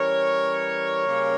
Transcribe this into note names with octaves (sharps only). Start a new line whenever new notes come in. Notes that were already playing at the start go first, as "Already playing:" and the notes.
Already playing: E3 G3 C#4 A#4 C#5
C#3 G3 A#3 C#4